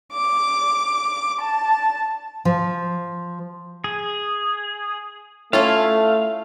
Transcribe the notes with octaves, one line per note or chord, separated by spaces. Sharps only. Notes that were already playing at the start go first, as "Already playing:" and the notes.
D6
A5
F3
G#4
A3 C#4 E4 F4 F5